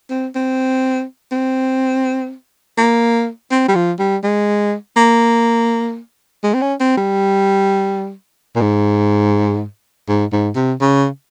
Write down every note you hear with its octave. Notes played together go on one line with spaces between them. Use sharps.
C4
C4
C4
A#3
C4
G3
F3
G3
G#3
A#3
G#3
C4
C#4
C4
G3
A#2
G#2
G#2
G#2
C3
C#3